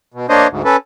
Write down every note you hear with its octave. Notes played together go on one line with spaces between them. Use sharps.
B2
A#3 D4 C5 C#5 D#5
D2 G#2
C#4 A4 B4